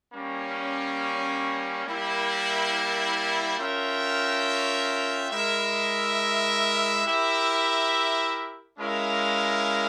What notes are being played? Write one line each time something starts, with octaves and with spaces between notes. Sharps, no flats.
G3 A#3 C#4
G3 A#3 E4 A#4
C#4 F4 A#4 E5 G5
G#3 E4 A#4 E5
E4 G4 A#4 E5
G#3 C#4 E4 A#4 F5